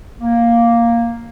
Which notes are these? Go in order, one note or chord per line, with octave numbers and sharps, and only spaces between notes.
A#3